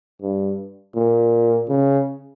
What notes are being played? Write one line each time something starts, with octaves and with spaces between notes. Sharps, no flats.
G2
A#2
C#3